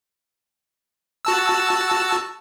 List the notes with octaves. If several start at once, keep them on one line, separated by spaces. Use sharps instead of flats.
F#4 A5 E6